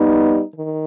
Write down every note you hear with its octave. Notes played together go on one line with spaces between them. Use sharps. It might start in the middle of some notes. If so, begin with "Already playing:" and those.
Already playing: G3 B3 D#4
D#3